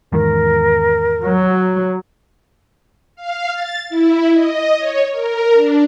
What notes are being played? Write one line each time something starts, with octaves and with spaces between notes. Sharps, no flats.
E2 G#2 D#3 A#4
F#3
F5
A6
E4
D#5
C#5
A#4
D4